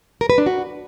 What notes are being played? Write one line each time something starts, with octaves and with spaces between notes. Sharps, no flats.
A#4
B4
D4
F#4